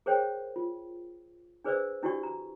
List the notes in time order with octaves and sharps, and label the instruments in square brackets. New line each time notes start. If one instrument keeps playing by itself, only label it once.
[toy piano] G#4 A#4 C5 C#5 G5
F4
D4 G#4 B4 C5 D5 E6
D4 E4 F#4 G4 D5 C#6
A#5